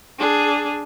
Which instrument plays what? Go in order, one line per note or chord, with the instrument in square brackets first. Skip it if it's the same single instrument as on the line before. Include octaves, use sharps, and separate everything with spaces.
[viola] D4 G#4